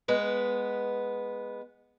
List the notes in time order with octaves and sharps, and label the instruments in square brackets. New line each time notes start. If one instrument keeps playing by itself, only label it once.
[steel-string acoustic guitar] G#3 B3 B4